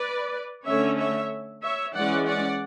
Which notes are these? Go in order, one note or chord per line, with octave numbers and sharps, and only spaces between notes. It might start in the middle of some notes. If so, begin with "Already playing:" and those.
Already playing: B4 D5
D3 A3 C#4 C#5 E5
C#5 E5
C#5 E5
E3 G#3 C#4 D5 F#5
D5 F#5